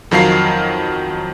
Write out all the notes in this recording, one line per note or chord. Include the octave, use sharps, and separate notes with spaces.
F2 D#3 F#3 A#4 F5 C7